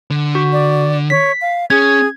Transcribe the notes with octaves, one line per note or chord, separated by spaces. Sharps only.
D3
F#4
D5
C#5 B6
F5
C#4 G#4 G#6